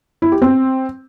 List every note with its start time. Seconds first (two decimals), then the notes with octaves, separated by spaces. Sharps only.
0.22 E4
0.32 G4
0.42 C4